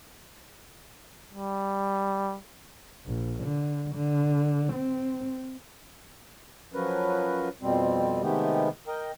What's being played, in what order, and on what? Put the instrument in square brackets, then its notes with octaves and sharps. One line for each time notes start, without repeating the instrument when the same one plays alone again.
[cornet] G3
[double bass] A#1
D3
D3
C4
[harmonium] F3 F#3 C#4 A#4 B4
F2 B2 G3 C4
C3 D#3 G#3 A3 B3 G4
A#4 D#5 G5